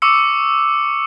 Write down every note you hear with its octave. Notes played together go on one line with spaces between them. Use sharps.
C#6 D6 E6 C#7